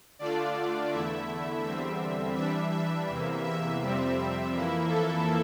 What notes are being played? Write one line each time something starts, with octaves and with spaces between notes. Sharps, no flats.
D3 A3 D4 F4 D5
E2 D3 A3 E4 E5
E2 D3 G3 C4 E5
E3 G3 D4 E5
E5
E2 C3 E3 A#3
E5
F2 C3 G3 C4
F2 E3 A#3 E4
A4